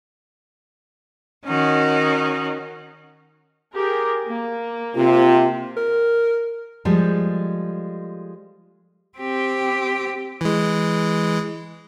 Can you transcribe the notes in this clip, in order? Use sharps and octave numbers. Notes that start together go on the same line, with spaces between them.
D#3 C#4 D#4 F#4
G4 G#4 A#4
A#3
C3 F4
A#4
F3 G3 G#3 A4
C4 G4
E3 G#3